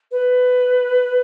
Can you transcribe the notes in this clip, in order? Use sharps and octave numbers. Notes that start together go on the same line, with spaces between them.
B4